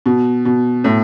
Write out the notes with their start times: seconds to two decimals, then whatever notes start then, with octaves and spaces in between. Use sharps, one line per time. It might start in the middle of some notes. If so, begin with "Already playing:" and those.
0.06 B2
0.45 B2
0.84 A2